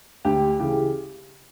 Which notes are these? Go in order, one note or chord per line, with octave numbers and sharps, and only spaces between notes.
D2 G4
C#3 E3 G4